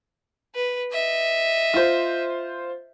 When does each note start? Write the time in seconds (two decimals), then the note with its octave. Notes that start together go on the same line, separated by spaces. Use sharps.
0.55 B4
0.93 D#5 E5
1.74 F4 C5